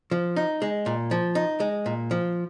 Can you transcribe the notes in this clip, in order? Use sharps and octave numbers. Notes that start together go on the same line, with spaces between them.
F3
D#4
G#3
A#2
F3
D#4
G#3
A#2
F3